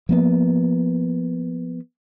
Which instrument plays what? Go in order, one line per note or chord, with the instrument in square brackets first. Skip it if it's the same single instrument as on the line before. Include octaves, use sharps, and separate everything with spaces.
[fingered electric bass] F3 A#3 B3